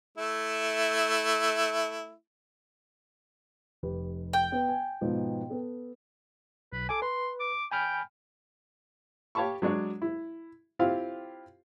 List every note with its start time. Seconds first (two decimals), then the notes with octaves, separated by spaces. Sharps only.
0.18 A3 E4
3.83 F1 G4 B4
4.33 G5
4.52 B3
4.69 G#5
5.01 G#2 B2 F3
5.50 B3 A4
6.73 B1 B4
6.89 A4 G#5 D6
7.02 B4 C6
7.40 D6
7.71 G5 G#5 B5 F6
9.35 G4 C#5 F5 A5 B5 C#6
9.62 F#3 G#3 D4 C#5 D5
10.02 E4
10.79 C4 E4 F4 G4 F5